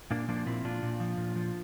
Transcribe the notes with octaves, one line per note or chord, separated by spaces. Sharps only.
A#2 A#3 D4
F3 A#3 D4
A#2 C4 E4
A#2 D4 F4
A#2
F3
A#2
F3